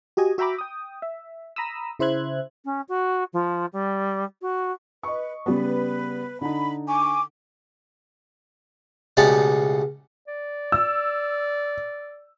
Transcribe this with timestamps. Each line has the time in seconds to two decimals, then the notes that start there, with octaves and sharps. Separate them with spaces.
0.17 F#4 G4 D#5 G#5
0.38 F#4 E5 G5 A#5 B5 D6
0.59 G5 D#6
1.02 E5
1.56 A#5 B5 D#6 E6
1.99 C#3 E4 C5 E5 F#6 G#6
2.65 C#4
2.88 F#4
3.33 F3
3.73 G3
4.41 F#4
5.03 B4 D#5 C#6
5.46 C#3 G3 B3 B4
6.41 D3 D#4 B5
6.88 G#5 C#6 D6
9.17 C#2 B2 A3 C#4 G4 D5
10.28 D5
10.72 E6